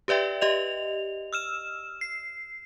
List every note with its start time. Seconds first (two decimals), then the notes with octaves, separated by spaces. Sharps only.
0.08 G4 B4 D5 E5 G5
0.41 G4 D#5 F7
1.33 E6 F6 E7
2.01 C7